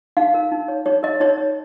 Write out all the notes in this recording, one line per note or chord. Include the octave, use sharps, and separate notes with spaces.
D#4 F5
A#4
D#4
C#5
D#4 C#5
A#4 D#5
D#4 C#5
C#5